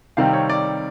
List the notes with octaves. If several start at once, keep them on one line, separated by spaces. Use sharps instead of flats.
C3 D#3 G3 C4 F5
C#5
D5